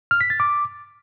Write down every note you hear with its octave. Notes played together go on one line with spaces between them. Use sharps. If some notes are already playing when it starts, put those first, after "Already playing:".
F6
B6
A6
D6